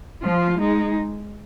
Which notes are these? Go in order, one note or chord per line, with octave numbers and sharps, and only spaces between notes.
F3 F4
G#3 D#4